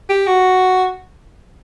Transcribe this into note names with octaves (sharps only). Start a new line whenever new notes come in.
G4
F#4